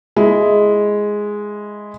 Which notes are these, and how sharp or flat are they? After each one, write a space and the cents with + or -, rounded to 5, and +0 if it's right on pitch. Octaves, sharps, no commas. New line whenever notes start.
G#3 +0 E4 +0